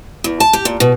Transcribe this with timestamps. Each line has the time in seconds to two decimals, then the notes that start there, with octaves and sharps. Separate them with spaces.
0.24 E2
0.40 A5
0.53 G4
0.65 A#2
0.80 B2